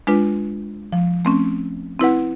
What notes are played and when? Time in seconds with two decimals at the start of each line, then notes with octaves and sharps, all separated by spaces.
0.07 G#3 D4 F4 B4
0.93 F3
1.25 A3 C4 C#4
1.99 C4 E4 B4 F#5